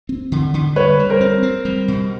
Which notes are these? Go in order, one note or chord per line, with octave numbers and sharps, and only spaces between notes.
C4
D3
D3
G3 B4 C#5
G3
A#4 C5
C4
C4
G3
B2